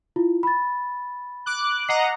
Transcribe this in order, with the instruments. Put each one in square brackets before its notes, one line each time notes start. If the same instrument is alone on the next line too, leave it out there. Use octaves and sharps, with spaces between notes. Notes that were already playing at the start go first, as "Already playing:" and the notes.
[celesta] E4 F4
B5 A6
[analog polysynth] D6 F#6
[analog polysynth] D#5 F#5 A#5 [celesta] C7